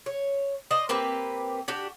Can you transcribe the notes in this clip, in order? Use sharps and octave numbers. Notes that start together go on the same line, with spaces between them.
C#5
C5 D5 D#5
A#3 C4 G4 B4
D4 F#4 G4